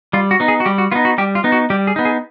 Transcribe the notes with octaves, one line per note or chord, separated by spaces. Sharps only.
G3 F4
F#4
B3 D#4
G#4
F#4
G3 G4
F#4
B3 D#4 F4
F#4
G3 G4
F4
B3 D#4
F#4
G3 G4
G#4
B3 D#4
G#4